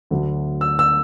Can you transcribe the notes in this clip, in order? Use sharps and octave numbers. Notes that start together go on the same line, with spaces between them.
D2 D3 F#3 A3
E6
E6